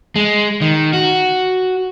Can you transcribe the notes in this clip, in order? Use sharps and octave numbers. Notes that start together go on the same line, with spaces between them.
G#3
D#3
F#4